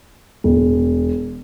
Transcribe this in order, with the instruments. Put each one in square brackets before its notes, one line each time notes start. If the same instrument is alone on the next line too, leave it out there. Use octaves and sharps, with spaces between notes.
[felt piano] E1